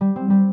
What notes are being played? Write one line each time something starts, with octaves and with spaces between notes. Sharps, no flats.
G3
C4
G3